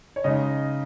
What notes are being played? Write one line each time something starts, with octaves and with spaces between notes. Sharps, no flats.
C#5
C#3 G#3 D#4 D#5